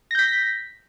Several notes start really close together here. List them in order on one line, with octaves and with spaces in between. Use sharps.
A#6 G6 B6